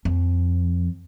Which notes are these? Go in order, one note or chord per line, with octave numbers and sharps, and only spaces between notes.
F2